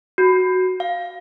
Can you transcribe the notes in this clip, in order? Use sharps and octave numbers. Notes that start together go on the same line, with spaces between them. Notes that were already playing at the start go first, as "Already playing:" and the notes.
F#4
F5